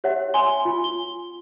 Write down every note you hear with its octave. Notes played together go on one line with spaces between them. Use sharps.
G4 C#5 E5 F#5
G#5 C6 G7
F4
G7